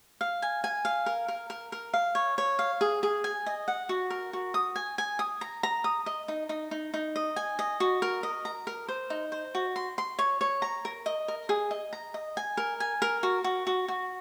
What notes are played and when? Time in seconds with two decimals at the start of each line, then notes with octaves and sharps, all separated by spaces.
0.21 F5
0.42 G#5
0.64 G#5
0.85 F5
1.06 A#4
1.28 A#4
1.50 A#4
1.72 A#4
1.94 F5
2.15 C#5
2.38 C#5
2.59 F5
2.81 G#4
3.03 G#4
3.24 G#5
3.46 D#5
3.68 F#5
3.89 F#4
4.10 A#4
4.33 F#4
4.54 D#6
4.76 G#5
4.98 G#5
5.19 D#6
5.41 A#5
5.63 A#5
5.84 D#6
6.06 D#5
6.28 D#4
6.49 D#4
6.71 D#4
6.94 D#4
7.16 D#5
7.36 G#5
7.59 D#5
7.80 F#4
8.02 A#4
8.23 D#5
8.45 A#5
8.67 A#4
8.88 C5
9.10 D#4
9.32 C5
9.55 F#4
9.76 C6
9.98 C6
10.19 C#5
10.41 C#5
10.62 A#5
10.85 A#4
11.06 D#5
11.28 A#4
11.49 G#4
11.71 D#5
11.93 A#5
12.14 D#5
12.37 G#5
12.57 A#4
12.80 G#5
13.02 A#4
13.23 F#4
13.44 F#4
13.67 F#4
13.88 F#4